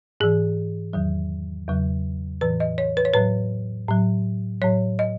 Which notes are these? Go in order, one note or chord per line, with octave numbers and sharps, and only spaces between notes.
G#2 E3 G#4
E2 D#3 F#3
E2 C#3 F#3
A2 E3 B4
D#5
C#5
B4
C#5
A2 F#3 B4
A2 F#3
A2 F#3 C#5
D#5